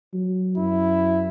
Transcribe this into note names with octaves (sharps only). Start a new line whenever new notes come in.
F#3
F#2 E4